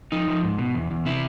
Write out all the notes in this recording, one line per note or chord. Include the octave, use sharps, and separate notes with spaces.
F3 D#4
F3
G#2
B2
E2
E2
C3 E4